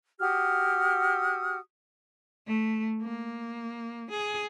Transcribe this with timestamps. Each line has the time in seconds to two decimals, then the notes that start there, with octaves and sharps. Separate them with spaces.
0.19 F#4 G4 D#6 F6
2.47 A3
3.02 A#3
4.11 G#4